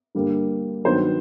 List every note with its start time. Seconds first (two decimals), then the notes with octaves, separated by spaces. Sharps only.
0.15 G2 D3 G3 A#3
0.85 G2 D#3 F#3 B3 C5